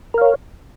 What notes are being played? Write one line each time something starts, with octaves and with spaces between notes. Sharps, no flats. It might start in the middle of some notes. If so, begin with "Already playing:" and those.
A#4 C#5 F5